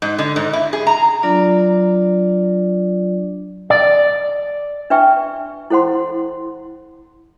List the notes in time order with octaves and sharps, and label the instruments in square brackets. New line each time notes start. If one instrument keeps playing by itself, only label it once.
[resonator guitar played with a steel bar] G#2
D3
G#2
E4
G#4
A#5
[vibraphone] F#3 D4 F4 D5
[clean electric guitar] D5
[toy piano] D4 B4 E5 G5 C#6
E4 A4 C5 F#5 C6